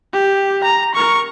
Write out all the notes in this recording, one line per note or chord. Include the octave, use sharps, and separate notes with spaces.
G4
A#5
A#4 C#6